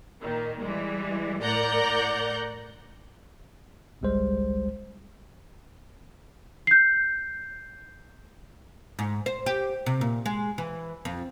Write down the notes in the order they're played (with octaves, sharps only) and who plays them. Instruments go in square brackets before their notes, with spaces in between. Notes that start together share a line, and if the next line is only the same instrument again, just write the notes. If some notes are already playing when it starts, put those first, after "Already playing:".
[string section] A#2 D#3
E3 G3 G#3
A2 A#4 D5 F#5 A#5 G6
[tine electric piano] G#1 C#2 G3 G#3 C5
[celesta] G6 C7
[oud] G#2
C5
G4
C3
A#2
G#3
E3
F2